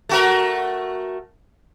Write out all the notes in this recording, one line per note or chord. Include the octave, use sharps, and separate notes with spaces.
A3 F#4 A#4